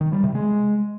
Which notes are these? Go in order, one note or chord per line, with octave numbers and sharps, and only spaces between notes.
D#3
G3
C3
G#3